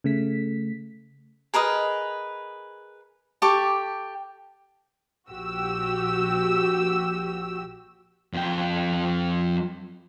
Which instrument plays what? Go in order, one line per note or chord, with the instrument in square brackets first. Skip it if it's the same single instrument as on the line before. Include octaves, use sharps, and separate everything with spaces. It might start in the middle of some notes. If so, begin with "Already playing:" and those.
[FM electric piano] C#3 A3 B6
[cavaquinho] G#4 A#4 B4 D#5
G4 A4 C#6 D6
[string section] A#1 F#4 G4 E6
[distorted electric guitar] F2 G5